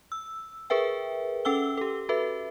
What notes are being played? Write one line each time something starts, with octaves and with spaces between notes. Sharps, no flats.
E6
G#4 A#4 B4 E5 G5
C#4 A4 G5 E6 G7
G4 A4
F#4 A4 B4 E5